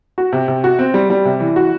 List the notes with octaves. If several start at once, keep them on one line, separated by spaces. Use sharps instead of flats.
F#4
C3
C3
F#4
C4
G3
G3
C3
E3
F#4